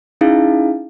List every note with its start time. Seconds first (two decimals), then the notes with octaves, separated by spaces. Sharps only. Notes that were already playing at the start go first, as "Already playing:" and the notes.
0.21 C#4 D#4 E4 G#4 F5